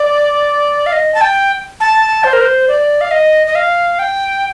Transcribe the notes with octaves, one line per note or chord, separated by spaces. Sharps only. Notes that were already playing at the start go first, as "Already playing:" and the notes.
Already playing: D5
F5
D#5
A5
G5
A5
C5
A#4
C5
D5
F5
D#5
D#5
F5
G5